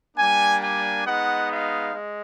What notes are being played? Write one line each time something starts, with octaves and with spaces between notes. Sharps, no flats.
G3 A#3 D4 G#5
G#5
G#3 B3 D#4 F#5
F5
G#3